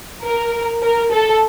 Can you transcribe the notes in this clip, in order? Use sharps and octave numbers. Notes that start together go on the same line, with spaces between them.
A#4
A#4
A4